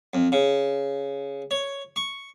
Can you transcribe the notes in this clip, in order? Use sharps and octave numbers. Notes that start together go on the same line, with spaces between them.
F2
C#3
C#5
C#6